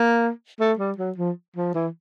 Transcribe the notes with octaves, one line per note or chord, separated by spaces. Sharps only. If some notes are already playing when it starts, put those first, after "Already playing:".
Already playing: A#3
A3
G3
F#3
F3
F3
E3